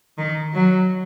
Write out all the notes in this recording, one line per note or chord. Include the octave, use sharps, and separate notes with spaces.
D#3
F#3